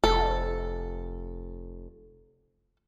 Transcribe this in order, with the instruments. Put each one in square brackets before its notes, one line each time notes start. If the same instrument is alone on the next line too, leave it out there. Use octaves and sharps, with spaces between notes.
[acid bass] F1 [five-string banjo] A4